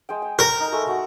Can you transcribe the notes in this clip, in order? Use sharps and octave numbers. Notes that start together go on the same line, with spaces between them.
G#3 G#4 G5
G5
A#4
D#4
G#3 A3 A4
F#4 F#5